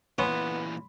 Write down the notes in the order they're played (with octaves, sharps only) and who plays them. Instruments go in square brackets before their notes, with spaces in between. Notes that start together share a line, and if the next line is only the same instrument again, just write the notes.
[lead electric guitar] A#2 E3 [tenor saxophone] B3 [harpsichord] C#4 [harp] B5 C6